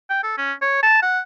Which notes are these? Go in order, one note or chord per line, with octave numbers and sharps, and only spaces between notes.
G5
A4
C#4
C#5
A5
F#5